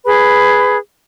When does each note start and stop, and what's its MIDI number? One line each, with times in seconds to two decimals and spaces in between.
0.05 0.77 68
0.05 0.77 71
0.05 0.77 83